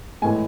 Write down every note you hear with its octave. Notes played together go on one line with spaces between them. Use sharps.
A2 E3 G#3 G#5